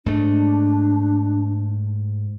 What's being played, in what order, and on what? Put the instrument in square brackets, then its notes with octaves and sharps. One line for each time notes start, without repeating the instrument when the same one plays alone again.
[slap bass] G#2 A3 [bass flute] D4